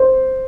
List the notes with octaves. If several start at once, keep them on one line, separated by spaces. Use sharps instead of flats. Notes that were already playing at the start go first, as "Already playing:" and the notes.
Already playing: C5